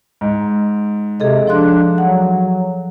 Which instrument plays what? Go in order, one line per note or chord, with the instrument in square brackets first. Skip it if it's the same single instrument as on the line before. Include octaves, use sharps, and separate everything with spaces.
[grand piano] G#2
[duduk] C3 [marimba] G#4 A4 D#5
[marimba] F3 C6 F#6 [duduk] D4
[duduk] F#3 [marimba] F#5